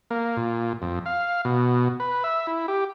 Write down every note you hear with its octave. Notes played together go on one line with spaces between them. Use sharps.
A#3
A#2
F2
F5
B2
B4
E5
E4
G4